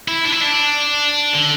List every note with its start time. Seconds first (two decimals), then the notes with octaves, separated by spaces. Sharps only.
0.08 E4
0.24 D4
0.32 E4
0.41 D4
1.34 D3